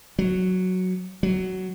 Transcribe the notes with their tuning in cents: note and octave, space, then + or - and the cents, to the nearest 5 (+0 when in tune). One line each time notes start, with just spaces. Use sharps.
F#3 -5
F#3 +10